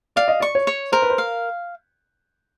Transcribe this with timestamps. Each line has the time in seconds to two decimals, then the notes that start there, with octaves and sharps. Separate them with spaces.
0.16 D5 F5
0.28 D#5
0.40 D5 C#6
0.55 C#5
0.67 C#5
0.92 A#4 C5
1.02 B4
1.10 C5
1.18 F5